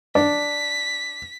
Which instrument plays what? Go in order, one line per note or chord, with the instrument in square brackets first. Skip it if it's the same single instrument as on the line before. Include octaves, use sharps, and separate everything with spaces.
[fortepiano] D4 [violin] B6